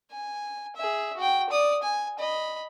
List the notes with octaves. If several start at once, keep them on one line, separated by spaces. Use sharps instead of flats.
G#5
G#4 E5
F#4 G5
D5 D#6
G#5
D#5 B5